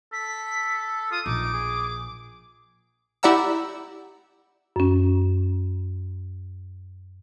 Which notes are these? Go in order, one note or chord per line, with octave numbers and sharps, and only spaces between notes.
A4 B6
F4 D#6
A#1 D#4 D6
G#4
E4 G4 D5 F#5 A#5 E6
F#2 C#4